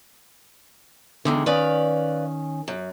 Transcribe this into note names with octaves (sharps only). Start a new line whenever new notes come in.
E2 D3 D#3 G#3
D#3 C#4 B4 D5 F5
F#2